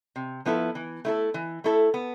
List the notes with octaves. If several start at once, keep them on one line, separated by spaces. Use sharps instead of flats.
C3
F3 B3 E4 A4
E3
A3 E4 A4
E3
A3 E4 A4
B3